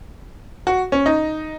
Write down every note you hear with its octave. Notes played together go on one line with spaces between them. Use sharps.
F#4
C#4
D#4